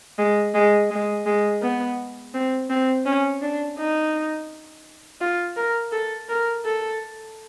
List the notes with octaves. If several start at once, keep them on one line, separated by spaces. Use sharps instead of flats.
G#3
G#3
G#3
G#3
B3
C4
C4
C#4
D4
D#4
F4
A#4
A4
A#4
A4